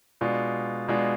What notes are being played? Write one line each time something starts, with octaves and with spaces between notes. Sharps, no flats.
B2 G#3 D4 F4
B2 G#3 D4 F4